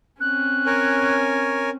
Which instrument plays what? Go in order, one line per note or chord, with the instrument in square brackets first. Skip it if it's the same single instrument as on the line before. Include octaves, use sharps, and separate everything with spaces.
[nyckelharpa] C4 C#4 [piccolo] F#6
[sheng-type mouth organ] A#4 C#5 G#5